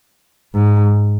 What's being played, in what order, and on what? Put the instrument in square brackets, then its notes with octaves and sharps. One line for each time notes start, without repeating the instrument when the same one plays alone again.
[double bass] G#2